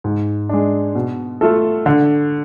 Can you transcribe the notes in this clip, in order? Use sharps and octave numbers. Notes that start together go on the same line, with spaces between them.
G#2
G#3 D4
B2
A3 F4 A4
D3